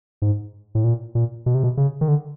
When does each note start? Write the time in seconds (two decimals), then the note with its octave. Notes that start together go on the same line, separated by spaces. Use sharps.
0.22 G#2
0.75 A2
0.84 A#2
1.15 A#2
1.46 B2
1.55 C3
1.64 B2
1.77 C#3
2.01 D#3
2.08 D3